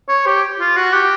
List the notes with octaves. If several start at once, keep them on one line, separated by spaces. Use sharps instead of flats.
C#5
G4
F4
F#4
G4